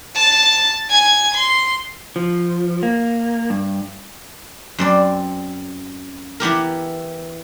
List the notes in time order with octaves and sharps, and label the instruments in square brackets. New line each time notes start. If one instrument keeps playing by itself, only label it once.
[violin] A5 A6
G#5 G#6
C6
[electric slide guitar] F3
A#3
G2
[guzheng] F#2 C4 D5
E3 B3 G4 A#4